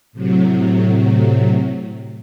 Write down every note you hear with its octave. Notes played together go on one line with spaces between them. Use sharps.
A2 C3 F#3